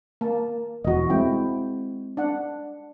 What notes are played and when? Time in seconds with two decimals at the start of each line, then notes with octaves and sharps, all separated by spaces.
0.21 A#3 A5
0.85 E1 E2 F#4 D#5
1.10 G#3 A3 C4 E4 G5
2.17 D4 F#5